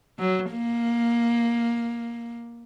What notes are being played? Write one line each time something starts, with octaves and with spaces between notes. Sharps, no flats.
F#3
A#3